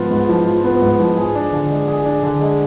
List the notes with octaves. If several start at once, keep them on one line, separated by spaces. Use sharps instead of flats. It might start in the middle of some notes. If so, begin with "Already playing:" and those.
Already playing: G#2 F3 B3 F4
G#2
F3
F4
B3
G#2
F3
G#4
D4
D3
G#3
G#4
D4
D3
G#3